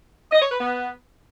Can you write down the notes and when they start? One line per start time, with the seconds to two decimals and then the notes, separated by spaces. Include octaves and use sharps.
0.32 D#5
0.41 C#5
0.50 B4
0.60 B3